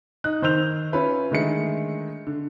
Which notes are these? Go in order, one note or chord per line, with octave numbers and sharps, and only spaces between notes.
D#4 F#6
D#3 C5 E6 G6 F7
C#4 F4 B4 E5
D3 D#3 G#3 A3 C#7
D3